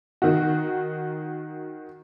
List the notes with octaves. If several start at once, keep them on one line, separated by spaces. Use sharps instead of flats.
D#3 F#4